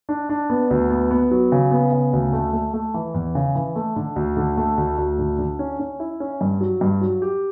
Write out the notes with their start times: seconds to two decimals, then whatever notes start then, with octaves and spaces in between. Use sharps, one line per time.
0.09 D4
0.29 D4
0.50 B3
0.70 D2
0.90 B3
1.11 B3
1.31 F#3
1.52 C#3
1.71 B3
1.92 C#3
2.13 D2
2.33 A3
2.53 A3
2.74 A3
2.94 E3
3.14 E2
3.35 C#3
3.55 E3
3.76 A3
3.96 D3
4.16 D2
4.37 D3
4.57 A3
4.78 D2
4.98 D2
5.19 D3
5.39 D3
5.59 C#4
5.80 C#4
6.00 E4
6.20 C#4
6.41 G2
6.61 F#3
6.81 G2
7.01 F#3
7.22 G4